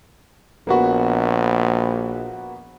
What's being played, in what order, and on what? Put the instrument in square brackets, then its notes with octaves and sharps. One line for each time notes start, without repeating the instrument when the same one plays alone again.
[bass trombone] A#1 [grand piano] A#3 B3 F#4